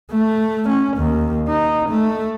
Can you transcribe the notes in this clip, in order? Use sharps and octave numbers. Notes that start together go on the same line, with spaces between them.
A3
C#4
D#2
D#4
A3